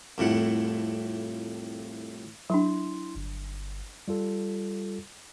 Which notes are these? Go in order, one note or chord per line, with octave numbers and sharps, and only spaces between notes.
C2 F2 A2 F#5
F#3 D4 E4 C6
G1
G3 F4 A4